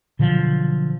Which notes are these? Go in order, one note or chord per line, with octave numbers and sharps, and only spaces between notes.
B2 D3 F3 F#3